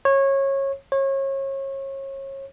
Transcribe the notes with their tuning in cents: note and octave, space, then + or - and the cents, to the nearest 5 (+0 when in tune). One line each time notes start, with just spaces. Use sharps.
C#5 -20
C#5 -30